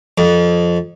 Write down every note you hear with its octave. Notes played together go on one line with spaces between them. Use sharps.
F2